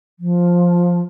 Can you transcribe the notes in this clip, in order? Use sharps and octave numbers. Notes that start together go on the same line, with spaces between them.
F3